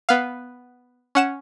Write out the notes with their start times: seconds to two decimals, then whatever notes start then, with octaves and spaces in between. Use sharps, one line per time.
0.09 B3 F5
1.15 C#4 F#5 E7